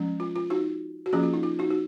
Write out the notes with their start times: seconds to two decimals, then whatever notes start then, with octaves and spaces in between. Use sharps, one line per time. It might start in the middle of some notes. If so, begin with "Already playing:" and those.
Already playing: F3 G#3 C#4
0.20 F4
0.36 F4
0.50 D#4 F#4
1.06 F#4
1.13 F3 A#3 C#4 F4 G#4
1.23 F4
1.34 D#4
1.43 F4
1.59 D#4 F#4
1.70 F#4